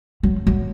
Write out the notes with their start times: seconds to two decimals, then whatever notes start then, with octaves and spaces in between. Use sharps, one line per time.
0.23 F#3
0.47 F#3